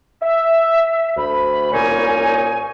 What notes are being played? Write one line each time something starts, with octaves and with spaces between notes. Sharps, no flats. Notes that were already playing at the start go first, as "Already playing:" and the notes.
E5
D2 B5
C2 A#2 C#4 D#4 C#5 G#5